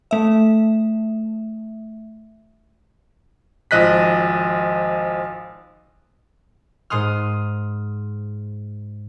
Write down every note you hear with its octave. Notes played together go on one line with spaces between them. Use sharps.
A3 E5
G#1 F3 D#5 F#6 B6
G#2 C6 D#6 F6